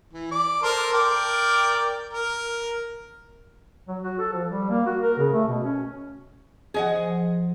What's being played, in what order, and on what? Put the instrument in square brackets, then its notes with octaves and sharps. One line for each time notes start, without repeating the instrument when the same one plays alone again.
[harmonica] E3
D5
A4 A#4 C5
A#4 D5 G5
A#4
[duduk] F#3
F#4
A4
F3
G3
A#3
F#4
A#4
C#3
A3
B2
C#4
[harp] F3 [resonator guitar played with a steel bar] G#4 D#5 F#5